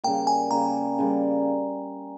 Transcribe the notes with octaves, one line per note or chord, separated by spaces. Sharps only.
C#3 G3 A#3 G5
G#5
C#3 G3 A#3 A#5
C#3 G3 A#3